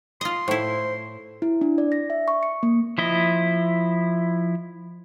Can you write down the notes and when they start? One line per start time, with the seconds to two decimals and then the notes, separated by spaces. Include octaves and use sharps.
0.21 F4 D#5 C6
0.48 A2 E4 C5
1.42 E4
1.61 D4
1.78 D5
1.92 A#6
2.10 E5
2.28 C#6
2.43 C#7
2.63 A#3
2.98 F3 E4 D#5